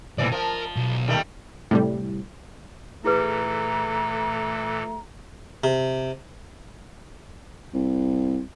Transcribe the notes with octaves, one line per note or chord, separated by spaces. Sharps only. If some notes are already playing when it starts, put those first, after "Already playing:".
C2 F2 A#2 E3 D5
F3 A#4
B1
D#3 G3 A3
A2 C3 G3
A#2 E3 A3 E4 G#4 A4 B4 A#5
C3
C2